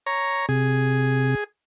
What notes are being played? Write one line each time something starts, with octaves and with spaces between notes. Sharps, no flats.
C#5 A#5
C3 G#4